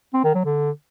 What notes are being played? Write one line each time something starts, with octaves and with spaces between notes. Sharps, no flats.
C4
D#3
F#3
D3